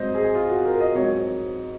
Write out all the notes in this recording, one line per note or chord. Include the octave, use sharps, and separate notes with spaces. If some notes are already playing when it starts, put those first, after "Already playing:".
Already playing: G#2 F#3 C4 C5 D#5
G#4
F4
F#4
A#4
D#5
G#2 F#3 C4 D#4 C#5